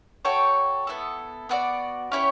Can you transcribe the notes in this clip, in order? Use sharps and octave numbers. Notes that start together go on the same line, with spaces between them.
F#4 A4 C#5 G5
B3 E4 A4
B3 F#4 A4 D5
C#4 E4 G4 C#5